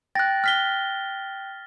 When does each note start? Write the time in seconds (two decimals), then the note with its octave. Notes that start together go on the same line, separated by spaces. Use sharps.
0.15 G5 F#6 A6 A#6
0.44 F6 B6 G7